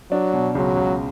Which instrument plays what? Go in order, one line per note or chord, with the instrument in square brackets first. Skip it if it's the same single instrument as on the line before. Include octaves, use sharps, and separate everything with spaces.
[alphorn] F#3 [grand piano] D4
[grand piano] B2
[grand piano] C#2 [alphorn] F#3
[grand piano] C#2